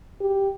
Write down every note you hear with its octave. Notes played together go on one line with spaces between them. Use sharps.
G4